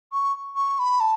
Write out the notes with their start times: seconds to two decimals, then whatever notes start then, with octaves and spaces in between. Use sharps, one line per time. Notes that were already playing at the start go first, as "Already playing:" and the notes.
0.13 C#6
0.56 C#6
0.79 B5
1.00 A5